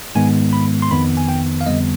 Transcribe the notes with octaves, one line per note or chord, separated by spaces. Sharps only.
G#2 D#3 G#3 B3 G#5
B5
C6
F2 D#3 B3 B5
G#5
G5
F5
F2 D3 G3 B3 D#5